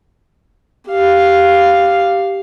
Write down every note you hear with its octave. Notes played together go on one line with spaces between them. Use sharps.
G4 F5